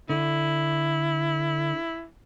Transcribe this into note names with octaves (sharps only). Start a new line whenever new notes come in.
D3 E4